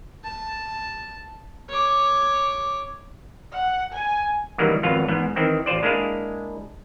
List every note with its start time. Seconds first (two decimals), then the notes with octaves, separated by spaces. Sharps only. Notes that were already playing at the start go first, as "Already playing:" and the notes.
0.24 A5
1.69 C#5 D6
3.53 F#5
3.93 G#5
4.58 C#2 D#3 E3 F#3 G3 A#3
4.83 G#1 F2 F#3 B3 F4 F5
5.08 E2 G#2 B3
5.36 D#3 E3 C4
5.66 A1 F4 C5 D5
5.83 G#3 A#3 D4 E4 G#4 F5